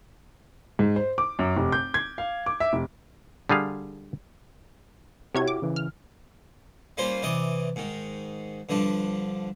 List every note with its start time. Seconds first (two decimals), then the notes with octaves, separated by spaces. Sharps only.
0.79 G#2
0.96 C5
1.18 D6
1.39 F#2
1.56 F1
1.72 G6
1.94 G#6
2.18 F5
2.46 D6
2.60 E5
2.73 F1
3.49 D3 G3 G#4 F5
5.35 C3 E4 F#4 G4 C#5 G#6
5.48 D6
5.62 C#3 E3
5.76 F6
6.97 G3 A#3 C#4 F4 C5
7.22 C3 E3 D5 D#5 D6
7.76 G#2 D#3
8.69 G2 D3 F3 D4